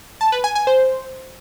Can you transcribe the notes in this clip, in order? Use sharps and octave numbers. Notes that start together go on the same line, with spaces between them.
A5
B4
G#5
G#5
C5